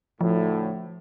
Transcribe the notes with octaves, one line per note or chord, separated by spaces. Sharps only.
D2 A2 F3